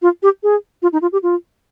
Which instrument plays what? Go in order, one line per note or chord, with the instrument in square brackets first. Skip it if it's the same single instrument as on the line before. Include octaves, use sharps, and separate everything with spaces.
[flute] F4
G4
G#4
F4
D#4
F4
G4
F4